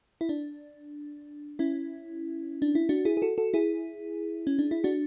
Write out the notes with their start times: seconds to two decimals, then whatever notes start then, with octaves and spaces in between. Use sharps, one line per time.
0.21 E4
0.29 D4
1.59 C#4 E4
2.62 D4
2.75 E4
2.89 D4 F#4
3.05 E4 G#4
3.17 G#4
3.22 F#4 A4
3.38 F#4 A4
3.54 E4 G#4
4.47 C#4
4.59 D4
4.71 E4
4.84 D4 F#4